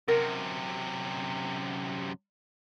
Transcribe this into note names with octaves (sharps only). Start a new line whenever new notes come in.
F#2 C3 A#4